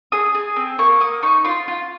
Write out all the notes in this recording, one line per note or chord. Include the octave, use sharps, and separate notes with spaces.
G#4 D#6
G#4
C4
A#3 C#6
A#3 D#6
D#4 C#6
F4 C6
F4